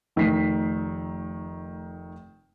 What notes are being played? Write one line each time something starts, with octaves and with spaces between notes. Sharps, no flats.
F1 D#3 A3 D#4 B6 C7